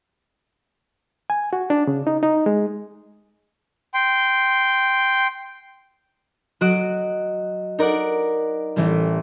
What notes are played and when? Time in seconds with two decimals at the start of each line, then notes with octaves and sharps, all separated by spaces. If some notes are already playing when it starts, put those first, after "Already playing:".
1.30 G#5
1.53 F#4
1.70 D4
1.87 C#3
2.07 D#4
2.23 D#4
2.46 G#3
3.94 G5 C6
6.61 F#3 F#4 D#5 F#6 D7
7.78 D#4 A#4 D5 F#5
8.76 A1 E3 G3